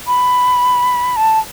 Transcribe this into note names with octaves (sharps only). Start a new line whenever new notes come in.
B5
A5